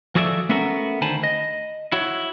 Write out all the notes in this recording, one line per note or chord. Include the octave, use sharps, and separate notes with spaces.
F3 F#4 G#4 A4 D5 E5
A3 B3 C#4 F#4 A4 A#4
D2 D#3 C5 G#5 A5 B5
D#5
E4 F#4 C#5